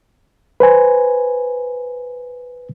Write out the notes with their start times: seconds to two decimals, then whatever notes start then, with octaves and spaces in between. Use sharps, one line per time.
0.60 B4 C5 G#5